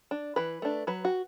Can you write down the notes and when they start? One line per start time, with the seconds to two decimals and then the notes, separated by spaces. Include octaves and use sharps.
0.11 D4
0.36 E3 B4
0.62 A3 D4
0.87 F#3 B4
1.05 F#4